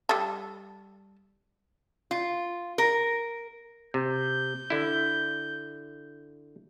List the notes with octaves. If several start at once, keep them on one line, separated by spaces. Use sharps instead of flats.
G3 A4
F4
A#4
C3 G6
D3 E4